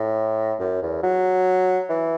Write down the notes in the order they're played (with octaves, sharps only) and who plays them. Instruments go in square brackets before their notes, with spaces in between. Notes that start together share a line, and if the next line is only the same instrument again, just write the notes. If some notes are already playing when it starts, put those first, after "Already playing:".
Already playing: [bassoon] A2
F#2
E2
F#3
E3